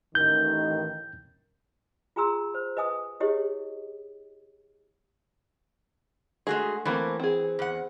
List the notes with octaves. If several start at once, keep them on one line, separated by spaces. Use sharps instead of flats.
A1 D#3 G6
F4 G#4 G#5 A#5 C6 E6
C5
B4 D#5 G#5 D#6
E4 G4 G#4 C#5 D#5
G#3 A3 F#4 G#4
E3 A3 A#3 C4
C4 G#4
E2 F#5